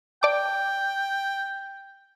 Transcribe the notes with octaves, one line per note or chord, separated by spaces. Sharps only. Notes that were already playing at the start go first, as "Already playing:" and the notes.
D5 G5 A5 D6